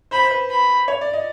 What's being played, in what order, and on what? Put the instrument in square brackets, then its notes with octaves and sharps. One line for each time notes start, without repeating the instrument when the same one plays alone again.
[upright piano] C5 [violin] B5
[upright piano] C5
B4
[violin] B5
[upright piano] C#5
D5
D#5